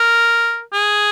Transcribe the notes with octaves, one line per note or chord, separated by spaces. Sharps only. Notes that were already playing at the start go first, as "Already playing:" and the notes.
Already playing: A#4
G#4